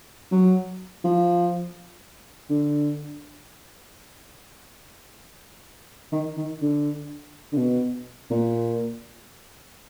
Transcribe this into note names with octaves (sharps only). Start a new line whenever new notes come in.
F#3
F3
D3
D#3
D#3
D3
D3
B2
A#2